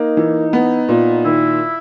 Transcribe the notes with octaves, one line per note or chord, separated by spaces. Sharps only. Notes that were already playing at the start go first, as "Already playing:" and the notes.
Already playing: A#3 D#4
E3
B3
A#2
D#3 E4